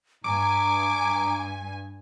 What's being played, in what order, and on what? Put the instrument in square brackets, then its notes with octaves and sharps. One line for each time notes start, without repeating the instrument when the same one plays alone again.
[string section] G2 G#5 [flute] A#5 [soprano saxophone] D6